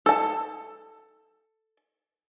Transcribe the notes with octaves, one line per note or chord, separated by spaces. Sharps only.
A4 A5